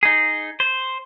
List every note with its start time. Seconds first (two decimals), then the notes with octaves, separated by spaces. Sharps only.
0.03 D#4 G#4
0.60 C5